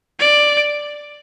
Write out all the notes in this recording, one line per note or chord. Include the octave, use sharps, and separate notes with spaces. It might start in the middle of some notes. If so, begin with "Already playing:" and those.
D5